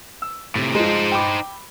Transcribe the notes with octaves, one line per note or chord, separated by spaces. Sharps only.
E6
A2 C3
F3 G#3 D#4 C5
G5 B5 D6